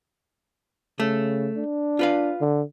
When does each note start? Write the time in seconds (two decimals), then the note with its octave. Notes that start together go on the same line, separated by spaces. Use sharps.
1.00 C#3 A3
1.57 D4
1.99 F4 B4 F5
2.41 D3